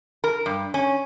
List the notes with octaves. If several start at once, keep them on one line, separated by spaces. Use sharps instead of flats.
A#4
G2
C#4